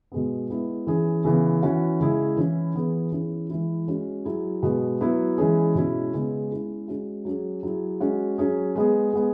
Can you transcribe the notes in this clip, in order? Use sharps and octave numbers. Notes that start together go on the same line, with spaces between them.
B2 G#3 B3
G#3 B3 E4
E3 C#4 G#4
C#3 E3 B3
E3 C#4 F#4
C#3 G#3 E4 G#4
E3 C#4 E4
E3 B3 G#4
E3 C#4 E4 G#4
E3 G#3 E4
G#3 C#4 F#4
F#3 E4 G#4
B2 G#3 B3
F#3 B3 E4
E3 G#3 C#4 G#4
B2 G#3 C#4 E4
C#3 G#3 B3
G#3 C#4 E4 G#4
G#3 C#4 F#4
F#3 C#4 G#4
F#3 E4 G#4
G#3 C#4 F#4
F#3 C#4 G#4
G#3 B3 G#4
G#3 B3 G#4